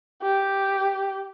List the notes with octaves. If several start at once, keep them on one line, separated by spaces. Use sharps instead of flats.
G4